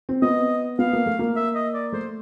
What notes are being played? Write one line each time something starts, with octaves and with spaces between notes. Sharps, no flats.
C4
B3 D#5
B3 F5
A#3
A3
A#3
E5
D#5
D5
A3 C5